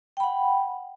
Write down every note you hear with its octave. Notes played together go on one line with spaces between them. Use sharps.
F#5 G5 B5